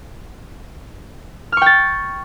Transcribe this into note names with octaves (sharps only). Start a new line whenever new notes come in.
G5 C#6 F6 A6